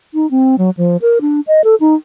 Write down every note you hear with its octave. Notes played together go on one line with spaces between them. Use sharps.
D#4
C4
F#3
F3
A#4
D4
D#5
A4
D#4